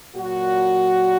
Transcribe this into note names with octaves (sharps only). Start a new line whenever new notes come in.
A#2 F#3 F#4